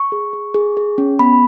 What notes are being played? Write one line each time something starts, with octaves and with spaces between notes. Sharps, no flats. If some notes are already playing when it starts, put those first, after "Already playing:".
Already playing: C#6
G#4
G#4
G#4
G#4
C#4
B3 B5